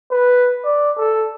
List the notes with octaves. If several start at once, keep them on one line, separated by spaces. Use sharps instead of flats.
B4
D5
A4